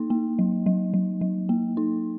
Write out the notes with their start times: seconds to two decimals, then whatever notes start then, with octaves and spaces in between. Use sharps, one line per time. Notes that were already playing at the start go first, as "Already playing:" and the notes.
Already playing: A#3 D#4
0.10 A#3
0.39 F#3
0.66 F#3
0.94 F#3
1.21 F#3
1.49 A#3
1.77 D#4